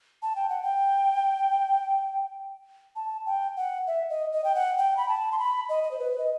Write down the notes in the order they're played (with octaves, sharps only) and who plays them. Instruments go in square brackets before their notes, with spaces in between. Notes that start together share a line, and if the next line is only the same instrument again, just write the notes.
[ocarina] A5
G5
F#5
G5
A5
G5
F#5
E5
D#5
D#5
G5
F#5
G5
B5
A5
C6
B5
D#5
D#5
C5
B4
D#5